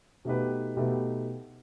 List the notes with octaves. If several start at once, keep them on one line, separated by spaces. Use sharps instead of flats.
B2 A3 D#4 G4 B4
B2 A3 D#4 G4 B4